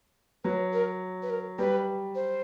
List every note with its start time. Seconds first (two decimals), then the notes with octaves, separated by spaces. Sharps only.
0.44 F#3 B4
0.73 A#4
1.23 B4
1.30 A#4
1.59 G3 B4
2.15 C5